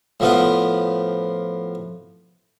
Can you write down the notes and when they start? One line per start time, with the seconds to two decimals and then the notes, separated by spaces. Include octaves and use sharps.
0.20 A2 F3 B3 F4